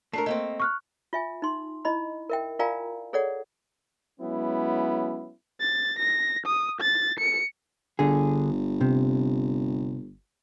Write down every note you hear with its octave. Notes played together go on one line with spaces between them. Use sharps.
A3 D4 A#4 A5 C7
A3 A#3 C4 D#5
C#6 F6 F#6
F4 E5 G#5
D#4 C6
E4 D#5 B5
A#4 E5 G5
F4 A#4 D5 F5 G#5 A#5
G#4 A4 C#5 D5 F#5
F#3 G#3 B3 C#4 E4
A6
A#6
D#6
A6
C#7
G1 D3 G#4
C3